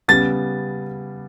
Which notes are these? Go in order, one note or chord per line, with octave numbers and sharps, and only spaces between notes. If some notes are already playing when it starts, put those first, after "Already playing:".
C#3 G3 B3 A6